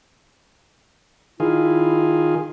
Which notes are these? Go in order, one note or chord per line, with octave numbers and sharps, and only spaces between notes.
D#3 E4 F4 G#4